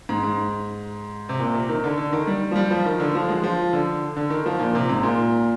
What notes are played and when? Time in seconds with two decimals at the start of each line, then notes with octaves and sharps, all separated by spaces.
0.09 G#2
0.24 G#2
1.29 C3
1.40 A#2
1.54 C3
1.69 D#3
1.84 D3
1.97 D3
2.12 D#3
2.27 G3
2.51 F3
2.56 G3
2.71 F3
2.86 D#3
3.00 D3
3.15 F3
3.29 G#3
3.43 F3
3.73 D3
4.17 D3
4.30 D#3
4.46 F3
4.60 A#2
4.75 C3
4.89 G#2
5.03 A#2